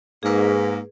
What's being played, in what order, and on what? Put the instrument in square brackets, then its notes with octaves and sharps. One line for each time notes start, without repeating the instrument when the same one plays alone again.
[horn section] G#2 A#3 [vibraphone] G#4 B4